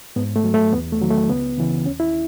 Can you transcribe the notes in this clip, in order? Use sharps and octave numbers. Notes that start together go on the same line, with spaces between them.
G#2 B3
A3
F#3
A3
E2 B3
A3
D#3 F#3
A3
C#2 B3
C#3 E3
D#2 C#4
E4